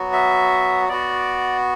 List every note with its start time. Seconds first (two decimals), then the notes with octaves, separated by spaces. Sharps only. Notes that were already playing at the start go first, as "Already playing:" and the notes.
Already playing: F#3 B3 F#4
0.13 E5
0.89 B3 F#4 D5